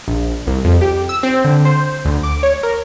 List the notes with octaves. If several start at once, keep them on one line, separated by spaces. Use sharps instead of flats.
A#1
C2
F2
G4
E6
C4
D3
C5
D2
D6
C#5
A#4